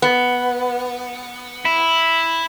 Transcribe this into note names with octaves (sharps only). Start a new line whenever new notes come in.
B3
E4